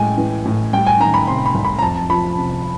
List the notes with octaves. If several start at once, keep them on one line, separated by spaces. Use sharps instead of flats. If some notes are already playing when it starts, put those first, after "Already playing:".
Already playing: A2 G#3 G5 G#5
E3
A2
G3 G5
G#5
D#3 A#5
B5
C3 C6
B5
C2
B5
A#5
F2 A5
F3 B5
C3